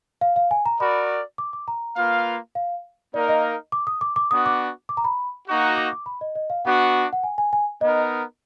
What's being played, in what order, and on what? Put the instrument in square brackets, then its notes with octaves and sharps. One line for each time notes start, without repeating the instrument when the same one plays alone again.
[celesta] F5
F5
G#5
A#5
[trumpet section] F#4 A#4 D5 [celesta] B5
[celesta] D6
D6
A#5
[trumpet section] A#3 F4 B4 F5
[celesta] F5
[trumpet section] A#3 D#4 A#4 F5 [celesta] D5
[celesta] D#5
D6
D#6
D6
D6
[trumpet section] B3 D4 F#4 [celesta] D#6
[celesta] D6
D6
A#5
B5
[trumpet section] A#3 D#4 F#4
[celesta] D6
D6
B5
D#5
D#5
F5
[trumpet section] B3 D4 F#4 [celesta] F#5
[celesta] F#5
G#5
G#5
G#5
[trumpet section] B3 D#4 A#4 [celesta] D#5